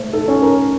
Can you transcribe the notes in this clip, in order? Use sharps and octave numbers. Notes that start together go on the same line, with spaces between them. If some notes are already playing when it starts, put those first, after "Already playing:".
Already playing: A3 C5
A4
C#4
A#4